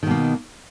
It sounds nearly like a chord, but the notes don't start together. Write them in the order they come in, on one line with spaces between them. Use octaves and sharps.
D#3 B2 A#3